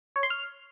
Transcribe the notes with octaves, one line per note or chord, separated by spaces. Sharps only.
C#5
C6
F6